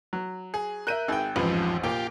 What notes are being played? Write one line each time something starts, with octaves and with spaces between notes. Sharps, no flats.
F#3
G#4
A#4 E5 F#6 G6 D#7
G#1 G#4 G5
A1 F2 G#2 F3 B4
A#2 F4 G4 G5